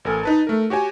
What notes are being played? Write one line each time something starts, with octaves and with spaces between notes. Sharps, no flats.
A1 A4 A#4 G#5
D#4 B4 A5
A3 A#4
F#4 G4 C#5 G#5